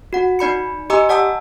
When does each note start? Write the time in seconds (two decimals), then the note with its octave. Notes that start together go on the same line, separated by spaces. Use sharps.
0.13 F#4 F#5
0.39 D#4 D5 B5 C#7
0.90 G4 D#5 G#5 A#5 D6 E6
1.09 D5 F#5 A5 D#6 E6